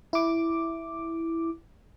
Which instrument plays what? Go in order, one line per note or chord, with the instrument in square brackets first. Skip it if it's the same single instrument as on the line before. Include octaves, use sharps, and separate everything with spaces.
[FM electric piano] E4 D6